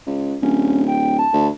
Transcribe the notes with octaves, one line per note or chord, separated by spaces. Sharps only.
C#2
D1 C#4
G5
A5
D2